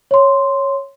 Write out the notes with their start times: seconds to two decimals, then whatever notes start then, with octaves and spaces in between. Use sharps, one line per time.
0.11 C#5 C6